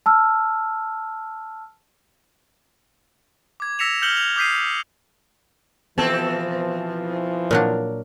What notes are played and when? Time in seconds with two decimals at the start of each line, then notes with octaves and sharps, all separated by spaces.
0.06 A5 E6 F6
3.60 D6 G#6
3.79 E6 A#6 B6 C#7 E7 F7
4.02 F6 G6 C#7 F#7 G7
4.17 F7
4.36 D6 D#6 G6 B6 C7 D#7
5.98 B2 E3 F3 B3 C4 A4 A5
7.51 A#2 F#3 D4 A#4